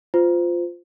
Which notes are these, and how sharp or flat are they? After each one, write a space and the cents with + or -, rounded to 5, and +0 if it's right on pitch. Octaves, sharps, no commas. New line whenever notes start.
F4 +0 C5 -25